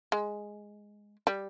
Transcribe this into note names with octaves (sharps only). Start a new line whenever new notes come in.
G#3
G3